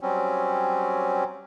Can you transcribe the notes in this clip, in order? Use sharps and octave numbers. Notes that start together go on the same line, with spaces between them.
F#3 G3 C4 C#4